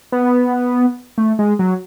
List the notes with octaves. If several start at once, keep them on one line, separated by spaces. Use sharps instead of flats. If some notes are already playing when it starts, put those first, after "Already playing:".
B3
A3
G#3
F#3